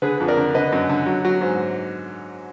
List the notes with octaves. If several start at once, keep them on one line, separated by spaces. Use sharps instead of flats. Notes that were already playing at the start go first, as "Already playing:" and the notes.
D3 G#4 B4
F2
A#4 D5
D3
D3 B4 D#5
F#2
D3
F#3
F#3
G#2